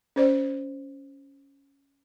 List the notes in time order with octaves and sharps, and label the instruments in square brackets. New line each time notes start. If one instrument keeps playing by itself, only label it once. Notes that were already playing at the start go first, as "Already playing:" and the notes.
[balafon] C#4 C5 D5